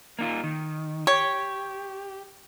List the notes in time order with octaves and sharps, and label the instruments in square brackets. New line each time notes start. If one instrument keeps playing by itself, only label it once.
[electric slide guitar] A#3 D#4 F4
D#3
[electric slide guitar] G4 [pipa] C#5